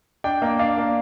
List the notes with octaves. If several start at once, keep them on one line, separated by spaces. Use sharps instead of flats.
D4 G5
A#3
D4 F5
A#3